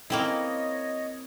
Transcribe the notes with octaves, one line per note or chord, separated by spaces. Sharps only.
A#3 C4 E4 C#5 D#5